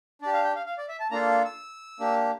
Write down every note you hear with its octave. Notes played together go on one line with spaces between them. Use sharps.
D4 G4 D5
F5
G5
F5
F5
D5
E5
A5
A#3 D4 F4 A4 A#5
E6
A#3 D4 G4